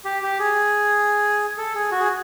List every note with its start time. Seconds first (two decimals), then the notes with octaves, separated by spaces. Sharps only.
0.05 G4
0.23 G4
0.39 G#4
1.58 A4
1.74 G#4
1.92 F#4
2.00 G#4